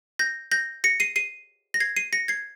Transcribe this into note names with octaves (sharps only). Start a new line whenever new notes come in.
G6 A#6
G6 A#6
A#6 C#7
C7 D#7
C7 D#7
A#6
G#6 C7
C7 D#7
A#6 C#7
G#6 C7